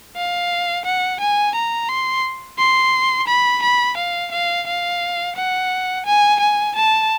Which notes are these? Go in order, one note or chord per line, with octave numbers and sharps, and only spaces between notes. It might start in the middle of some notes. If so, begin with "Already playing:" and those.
F5
F#5
G#5
A#5
C6
C6
B5
B5
F5
F5
F5
F#5
G#5
G#5
A5